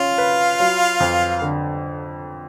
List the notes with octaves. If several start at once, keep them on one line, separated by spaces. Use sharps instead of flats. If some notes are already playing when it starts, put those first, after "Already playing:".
Already playing: C#4 F4 F5
B4
F#3
F2
D3